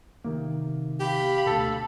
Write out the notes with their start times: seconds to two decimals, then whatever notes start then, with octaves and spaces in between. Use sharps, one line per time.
0.24 C3 D#3 A#3
1.00 G4 F5 B5
1.46 D2 B2 A4